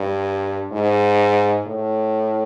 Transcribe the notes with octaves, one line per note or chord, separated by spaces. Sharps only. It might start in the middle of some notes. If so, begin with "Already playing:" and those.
Already playing: G2
G#2
A2